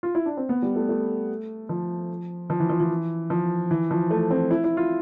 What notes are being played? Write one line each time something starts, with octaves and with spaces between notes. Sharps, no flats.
F4
E4
D4
C4
B3
G3
A3
A3
F3
F3
E3
F3
E3
F3
E3
F3
A3
C4
E4
E4
F4